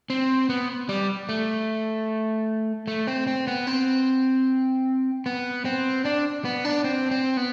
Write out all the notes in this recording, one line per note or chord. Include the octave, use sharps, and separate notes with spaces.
C4
B3
G3
A3
A3
C4
C4
B3
C4
B3
C4
D4
B3
D4
C4
C4
B3